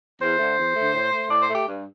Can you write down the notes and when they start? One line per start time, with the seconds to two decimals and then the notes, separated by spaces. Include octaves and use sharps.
0.21 E2 C5
0.39 D3 A3
0.58 E2
0.75 D3 A3
0.94 A2
1.12 A3
1.30 A2 D5
1.42 C5
1.48 A3
1.55 G4
1.67 G2